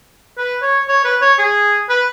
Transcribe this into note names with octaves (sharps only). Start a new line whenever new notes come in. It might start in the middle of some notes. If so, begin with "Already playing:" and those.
B4
C#5
C#5
B4
C#5
G#4
B4